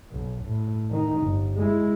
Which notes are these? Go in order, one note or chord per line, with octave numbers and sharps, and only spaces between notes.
B1
A2
D#3 D#4
G1
G#3 E4